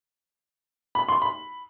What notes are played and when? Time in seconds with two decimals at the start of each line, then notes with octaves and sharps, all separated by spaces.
0.95 B5
1.08 C6
1.22 B5